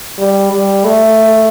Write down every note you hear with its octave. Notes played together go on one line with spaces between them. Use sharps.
G3
G3
A3